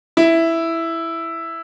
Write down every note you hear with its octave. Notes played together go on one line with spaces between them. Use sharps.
E4